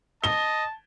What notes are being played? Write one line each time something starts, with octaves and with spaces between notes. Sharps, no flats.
D#5 A5 G7